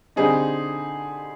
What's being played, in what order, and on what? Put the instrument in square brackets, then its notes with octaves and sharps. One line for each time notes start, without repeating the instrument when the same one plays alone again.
[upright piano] D3 G3 C4 D#4 G#4